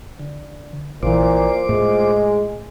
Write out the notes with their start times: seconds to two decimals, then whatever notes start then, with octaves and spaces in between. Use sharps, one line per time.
0.19 D3
1.03 A#1 A#2 E3 F4 C5 D6
1.69 A2 G#3